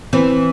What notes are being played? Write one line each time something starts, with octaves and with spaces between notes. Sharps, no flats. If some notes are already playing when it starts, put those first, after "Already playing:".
E3 C4